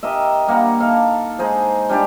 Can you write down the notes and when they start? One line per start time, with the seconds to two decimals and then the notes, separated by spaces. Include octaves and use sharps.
0.03 G4 A#4 D#5 E5
0.48 G3 A#3 F#5 A#5
0.80 D#4 A4 F5
1.39 G#3 D#4 G#4 C5
1.89 G3 D4 G4 D5